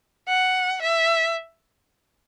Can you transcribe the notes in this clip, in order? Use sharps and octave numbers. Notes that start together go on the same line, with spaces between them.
F#5
E5